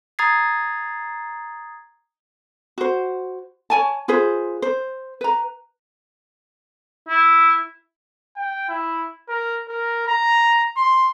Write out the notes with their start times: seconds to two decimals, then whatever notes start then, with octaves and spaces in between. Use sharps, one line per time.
0.19 A#5 D#6 G#6 A6 C7
2.78 F#4 C5
3.70 C#5 G#5 A5
4.08 F4 G#4 B4 C5
4.62 C5
5.21 B4 A#5
7.09 E4
8.36 G5
8.69 E4
9.29 A#4
9.68 A#4
10.07 A#5
10.77 C6